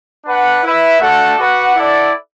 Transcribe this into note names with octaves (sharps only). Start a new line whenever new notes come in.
D4 B4 F#5
E4 B4 E5
A3 D4 F#4 A4 F#5
F#4 B4 D5 F#5
E4 A4 D5 F#5